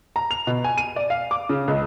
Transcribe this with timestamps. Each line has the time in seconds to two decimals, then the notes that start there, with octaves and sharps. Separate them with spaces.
0.16 A#5
0.31 F7
0.47 B2
0.64 G#5
0.78 D#7
0.96 D5
1.10 F5
1.31 D6
1.49 C#3
1.68 C#2